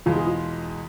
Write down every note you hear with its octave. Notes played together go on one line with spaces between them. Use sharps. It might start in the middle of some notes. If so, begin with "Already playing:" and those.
E2 B2 G#3 F4
G#4
F4